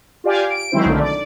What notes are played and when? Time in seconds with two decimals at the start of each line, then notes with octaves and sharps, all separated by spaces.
0.24 F4 G4 D5 F5 G#5
0.50 D7
0.72 D#3 F#3 G#3 C4 E4 C5
0.85 B1 D3 D#3 A3
0.99 D5